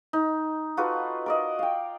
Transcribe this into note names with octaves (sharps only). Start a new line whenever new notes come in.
D#4
F4 F#4 A4 B4
A#4 D5 D#5
F5 G5